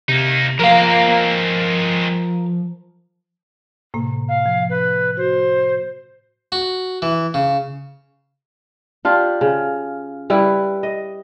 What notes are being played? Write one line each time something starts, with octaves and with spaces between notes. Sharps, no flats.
C3 A#3 D#4
F3 G#3 C4 A#4 F5
A2 C3 A#3
F5
F3
B4
F#4 C5
F#4
E3
C#3
D4 F4 G4
C#3
G3 E4 B4
D#5